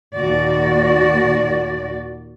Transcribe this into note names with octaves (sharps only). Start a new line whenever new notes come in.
D#2 A#2 F#4 D5